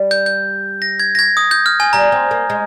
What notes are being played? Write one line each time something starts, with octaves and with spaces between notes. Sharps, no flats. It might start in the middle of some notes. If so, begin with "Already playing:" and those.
Already playing: G3
G6
G6
A#6
G#6
A#6
G#6
D#6
G6
F6
G#5
G3 A#5
C4
A#3
G#3